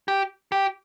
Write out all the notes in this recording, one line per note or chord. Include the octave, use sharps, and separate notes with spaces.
G4
G4